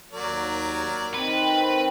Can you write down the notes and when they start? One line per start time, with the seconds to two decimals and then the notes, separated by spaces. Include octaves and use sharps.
0.12 D#2 F#3 A#4 D5
1.14 D#3 C4 B4